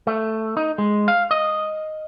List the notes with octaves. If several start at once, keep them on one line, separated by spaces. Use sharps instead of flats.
A3
D#4
G#3
F5
D#5